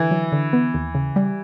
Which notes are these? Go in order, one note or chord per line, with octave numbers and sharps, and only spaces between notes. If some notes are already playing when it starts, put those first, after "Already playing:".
Already playing: D3 E3
F#3
D3
B3
D#2
C#3
G3